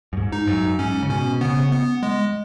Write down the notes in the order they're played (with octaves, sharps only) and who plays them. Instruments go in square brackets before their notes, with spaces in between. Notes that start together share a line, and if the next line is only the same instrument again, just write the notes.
[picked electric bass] F#2
G#2
[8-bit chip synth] D#4
[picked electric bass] F#2
[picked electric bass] G#2 [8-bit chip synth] C#4
[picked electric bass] C#3
[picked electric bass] B2 [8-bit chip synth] C#4
[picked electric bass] C#3 [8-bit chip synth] B3
[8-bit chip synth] B3
G#3